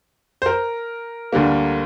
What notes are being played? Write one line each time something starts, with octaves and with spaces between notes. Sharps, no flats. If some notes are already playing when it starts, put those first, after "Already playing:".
C5
A#4
D2 D3 G3 A#3